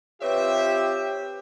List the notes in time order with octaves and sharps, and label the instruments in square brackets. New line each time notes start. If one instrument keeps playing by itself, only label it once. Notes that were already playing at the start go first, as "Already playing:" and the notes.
[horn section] C4 F4 E5 [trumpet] G4 [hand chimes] B4 C#5